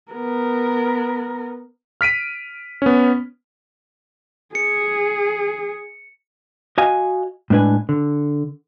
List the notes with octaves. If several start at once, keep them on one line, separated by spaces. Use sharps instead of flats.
B3 A#4
F6 B6 D7 D#7
B3 C#4
G#4 C#7
F#4 D#5 F5 G#5
A2 G#3 D4 B4 G#5
D3